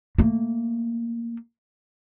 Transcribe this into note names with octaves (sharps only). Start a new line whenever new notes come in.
A3 A#3